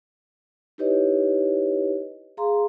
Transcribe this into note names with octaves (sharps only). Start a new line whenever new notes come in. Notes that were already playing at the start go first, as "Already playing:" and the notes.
D#4 E4 G4 B4 C#5 D#5
G#4 F5 A#5 C6